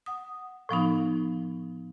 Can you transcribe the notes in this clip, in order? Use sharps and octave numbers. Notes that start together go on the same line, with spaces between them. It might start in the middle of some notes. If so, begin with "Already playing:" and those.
F#5 D#6
A2 F3 B3 D#4